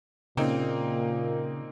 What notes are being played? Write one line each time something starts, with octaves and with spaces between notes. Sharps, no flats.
A#2 C#3 A#3 C4 D#4